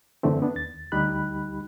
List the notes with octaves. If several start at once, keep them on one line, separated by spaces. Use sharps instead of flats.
F#2 D3 E3 A3 C4
B3 D4
D#2 A6
D2 G3 D#4 G4 B5 F#6